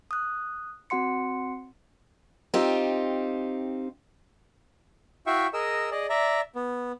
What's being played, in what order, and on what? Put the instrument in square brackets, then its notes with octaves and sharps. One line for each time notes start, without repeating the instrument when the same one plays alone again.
[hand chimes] D#6 F#6
C4 F#4 F#5 C6 C#7
[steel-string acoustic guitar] C4 D#4 F4 G4
[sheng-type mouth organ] E4 F#4 E5 F5 G5 C#6
G#4 A#4 D#5 E6
G#4 D5 D#5
D5 E5 A#5
B3